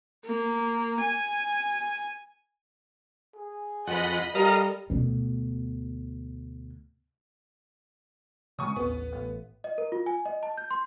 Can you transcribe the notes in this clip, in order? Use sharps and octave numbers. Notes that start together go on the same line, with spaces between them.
A#3
G#5
G#4
F2 D#5 F#5 B5
G3 A4 A#4 D#5 F5 A#5
D2 B2
C#3 G3 G#3 G#5 C#6 D#6
A1 D#2 G#2 B3
A1
D#5
A#4
F4
G#5
D#5
A5
G6
C6